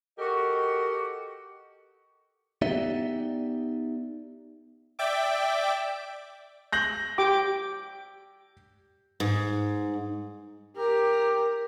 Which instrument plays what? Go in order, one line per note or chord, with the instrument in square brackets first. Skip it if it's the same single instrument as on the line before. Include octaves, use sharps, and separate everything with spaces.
[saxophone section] F#4 G4 A4 A#4 D#5
[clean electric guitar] B3 D#4 G4 D5 E5
[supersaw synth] D5 E5 G5 D6
[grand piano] G6 A#6 F#7
[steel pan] G4 G5 D6
[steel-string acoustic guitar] G#2
[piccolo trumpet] G4 [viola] A#4